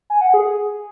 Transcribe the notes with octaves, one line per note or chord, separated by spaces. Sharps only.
G#5
F#5
G#4
G#4